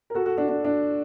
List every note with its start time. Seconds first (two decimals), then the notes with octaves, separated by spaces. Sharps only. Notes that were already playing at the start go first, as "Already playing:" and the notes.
0.10 A#4
0.14 F#4 A4
0.26 F#4 A4
0.37 D4 F#4
0.48 D4
0.65 D4